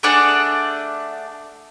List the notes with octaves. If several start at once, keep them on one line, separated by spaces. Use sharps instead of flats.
A3 D4 G#4 D5 F#5